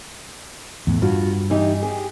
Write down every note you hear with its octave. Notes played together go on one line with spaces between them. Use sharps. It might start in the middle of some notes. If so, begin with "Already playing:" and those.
E2 A2
G2 F4 F#4
E3 D#4 G4
G4 G#4